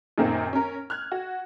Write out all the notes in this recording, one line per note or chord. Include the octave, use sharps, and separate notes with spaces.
F#2 A#2 D#3 A#3 C4
C#4 A#4
F6 F#6 G#6
F#4